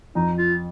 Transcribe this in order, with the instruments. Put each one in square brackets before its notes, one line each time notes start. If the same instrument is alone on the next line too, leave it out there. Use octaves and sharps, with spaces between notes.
[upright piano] F2 [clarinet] D#4
[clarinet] F4